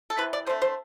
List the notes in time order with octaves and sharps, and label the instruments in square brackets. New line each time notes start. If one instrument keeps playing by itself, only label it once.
[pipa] A4
C3 E3 G3 B4
D5
D3 A3 C4 C5
C5